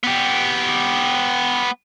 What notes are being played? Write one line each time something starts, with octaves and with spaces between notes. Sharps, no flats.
B3 G4